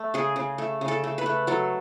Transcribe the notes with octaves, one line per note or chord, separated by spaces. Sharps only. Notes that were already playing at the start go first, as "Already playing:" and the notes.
Already playing: A3
C#3 G#4
C#3
A3
C#3
A4
A3
B4
A3
F#3 A4